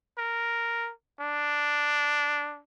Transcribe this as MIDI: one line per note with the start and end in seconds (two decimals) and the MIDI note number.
0.18 0.91 70
1.20 2.60 62